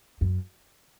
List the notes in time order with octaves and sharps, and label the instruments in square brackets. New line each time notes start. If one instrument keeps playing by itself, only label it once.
[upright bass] F#2